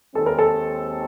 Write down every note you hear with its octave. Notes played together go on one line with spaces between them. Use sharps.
D#2 D#3 G#3 C4 A4
A#4
A4